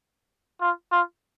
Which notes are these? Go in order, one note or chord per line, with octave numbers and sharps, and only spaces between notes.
F4
F4